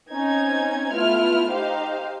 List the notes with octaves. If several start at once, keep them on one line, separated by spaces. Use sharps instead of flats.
C4 C#4 D#4 G#6
A3 B3 E4 F4 F6
D#4 G4 C5 F5